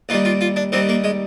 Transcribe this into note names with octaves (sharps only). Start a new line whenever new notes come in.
D#2 D#3 G3 F4
F4
F4
D4
D#2 D#3 G3 C4
A#3
G#3